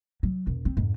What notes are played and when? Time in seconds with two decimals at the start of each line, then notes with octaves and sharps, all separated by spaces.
0.23 F#3
0.47 E1
0.65 C4
0.77 F2 G#2